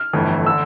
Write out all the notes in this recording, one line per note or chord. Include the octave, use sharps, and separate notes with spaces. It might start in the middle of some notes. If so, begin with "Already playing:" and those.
Already playing: F6
G1 F2 E3 A3
D3 E6